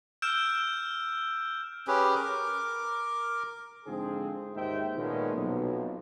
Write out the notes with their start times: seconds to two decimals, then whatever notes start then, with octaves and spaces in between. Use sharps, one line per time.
0.22 E6 F6 G6 D7 E7
1.88 C#4 G4 G#4 B4
2.16 A#4 D6
3.86 G#2 D3 F3 C4 G#4
4.55 D#2 G#2 D#4 C5 E5 G5
4.96 A#2 D#3 G#3 A3 B3 C#4
5.34 B1 F2